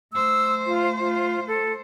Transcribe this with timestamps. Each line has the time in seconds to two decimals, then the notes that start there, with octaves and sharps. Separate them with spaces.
0.13 A3 C5 E6
0.67 F4
0.99 F4
1.48 A4